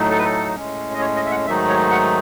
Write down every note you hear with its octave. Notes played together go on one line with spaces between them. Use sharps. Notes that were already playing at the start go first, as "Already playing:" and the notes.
Already playing: A2 F#3 A3 D#4
A4
B4
A4
A2 G#3 C#4
D#5
C#5
D#5
E5
F#5
G#2 D#3 F#3 A3 D#4 E5
C#5
F#5